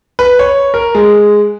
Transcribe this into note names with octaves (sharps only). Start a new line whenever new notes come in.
B4
C#5
A#4
G#3